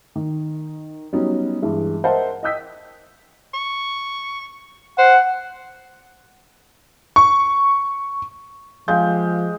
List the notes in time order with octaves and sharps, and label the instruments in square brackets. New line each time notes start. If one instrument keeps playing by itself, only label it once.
[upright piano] D#3
F#3 G3 B3 C#4 D#4
G2 E3 G#3
A#4 C5 D#5 E5 F#5 A5
D#5 G5 D#6 E6 G6 B6
[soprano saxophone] C#6
[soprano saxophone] C5 [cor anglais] F#5
[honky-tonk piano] C#6
[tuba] F3 [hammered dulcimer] G#3 G4 [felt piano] F5 G6